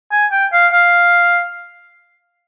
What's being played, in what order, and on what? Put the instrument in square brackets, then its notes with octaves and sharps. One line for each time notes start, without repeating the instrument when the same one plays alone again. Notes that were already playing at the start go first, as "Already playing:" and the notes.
[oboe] G#5
G5
F5
F5